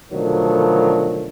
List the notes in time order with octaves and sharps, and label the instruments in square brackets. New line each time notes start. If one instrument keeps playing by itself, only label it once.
[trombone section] B2 D3 D#3 F3 F#3 A3